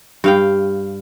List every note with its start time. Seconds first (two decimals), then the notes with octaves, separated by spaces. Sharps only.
0.24 G2 F5 G5